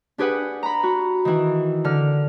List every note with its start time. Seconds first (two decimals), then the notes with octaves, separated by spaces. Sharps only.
0.18 D4 G4 G#4 B4 F#5
0.63 A#5 B5
0.83 F#4
1.25 D#3 E3
1.84 D3 F6